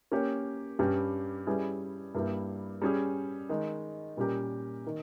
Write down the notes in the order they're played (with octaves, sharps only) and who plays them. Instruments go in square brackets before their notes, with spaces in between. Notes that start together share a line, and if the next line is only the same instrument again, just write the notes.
[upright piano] A#3 C#4 G4 C#5
G2 G3 C#4 G4
G3 C#4 E4 G#4 B4
G2 G3 A#3 E4 G4
G3 C#4 G#4
D#3 G#3 D#4
A#2 G3 C#4 G4 A#4
D#3